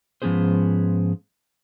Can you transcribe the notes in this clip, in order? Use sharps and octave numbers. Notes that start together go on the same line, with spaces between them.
G#2 F3 B3 C#4 G#4 C5